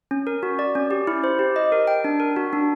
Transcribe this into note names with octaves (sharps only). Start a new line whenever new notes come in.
C#4
A#4
F#4
D5
C#4
G4
E4
C5
G4
D#5
A#4
G5
D4
A#4
F#4
D4